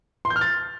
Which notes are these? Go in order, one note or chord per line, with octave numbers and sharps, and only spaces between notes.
C6
G6
F6
A6